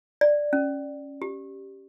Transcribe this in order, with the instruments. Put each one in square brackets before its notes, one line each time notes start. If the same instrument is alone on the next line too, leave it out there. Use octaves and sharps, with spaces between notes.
[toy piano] D5
C#4
G4